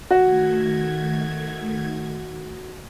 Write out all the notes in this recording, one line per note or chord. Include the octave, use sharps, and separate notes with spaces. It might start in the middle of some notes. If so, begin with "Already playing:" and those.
D#3 A3 F#4 G#6